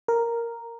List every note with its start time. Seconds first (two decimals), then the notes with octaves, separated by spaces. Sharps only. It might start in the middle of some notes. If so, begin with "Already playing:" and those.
0.08 A#4